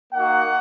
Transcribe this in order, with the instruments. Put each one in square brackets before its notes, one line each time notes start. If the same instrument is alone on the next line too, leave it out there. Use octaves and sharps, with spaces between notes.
[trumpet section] A#3 D#4 F#4 F#5